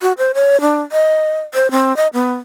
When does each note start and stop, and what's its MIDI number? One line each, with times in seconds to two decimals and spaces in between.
0.02 0.12 66
0.18 0.32 72
0.34 0.60 73
0.61 0.81 62
0.92 1.39 75
1.54 1.71 72
1.71 1.95 60
1.97 2.07 75
2.13 2.33 59